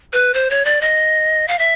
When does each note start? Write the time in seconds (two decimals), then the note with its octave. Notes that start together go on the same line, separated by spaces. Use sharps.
0.13 B4
0.34 C5
0.50 C#5
0.65 D5
0.81 D#5
1.48 F5
1.59 E5